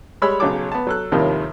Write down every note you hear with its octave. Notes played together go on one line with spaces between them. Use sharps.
G3 G#3 C#5 B5 E6
B1 C#3 F#3 C#5 A5 D6
B3 A5
F#3 A4 F#6
D#2 A2 C3 D#3 F3 G3